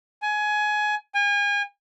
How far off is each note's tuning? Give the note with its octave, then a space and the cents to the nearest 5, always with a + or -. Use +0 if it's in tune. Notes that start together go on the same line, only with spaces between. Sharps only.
G#5 +20
G#5 -35